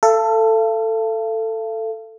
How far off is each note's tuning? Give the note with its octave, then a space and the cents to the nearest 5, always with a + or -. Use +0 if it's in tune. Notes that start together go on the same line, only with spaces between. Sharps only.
A4 +15 F5 -40